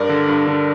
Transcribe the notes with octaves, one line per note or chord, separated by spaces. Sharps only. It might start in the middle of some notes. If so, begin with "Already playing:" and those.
Already playing: G2 A#4 D5
D3
G2
D3